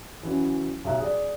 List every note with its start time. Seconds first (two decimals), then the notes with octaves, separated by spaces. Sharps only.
0.23 E3 F#3 C#4
0.85 B1 G4 E5 A#5 F#6
0.98 G#4 D5